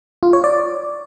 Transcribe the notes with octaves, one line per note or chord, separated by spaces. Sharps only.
F4
C#5
D5